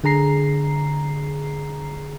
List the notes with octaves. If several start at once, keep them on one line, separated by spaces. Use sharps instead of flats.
D3 G#4 A#5 C7